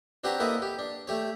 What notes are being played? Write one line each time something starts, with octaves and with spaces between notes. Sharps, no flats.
C4 D4 F#4 G4 B4 A#5
A#3 E4 A4 B4 D#5
G4
D4
A3 G4 C#5